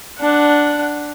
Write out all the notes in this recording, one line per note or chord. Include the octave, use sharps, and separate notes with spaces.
D4 F#5